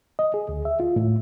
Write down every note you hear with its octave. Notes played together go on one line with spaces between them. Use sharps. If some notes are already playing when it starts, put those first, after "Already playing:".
D#5
G#4
D2
E5
F4
A2